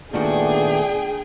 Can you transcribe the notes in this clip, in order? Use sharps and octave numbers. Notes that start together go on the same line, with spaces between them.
A#2 D#3 A3 B3 D4 F#4 G#4 G5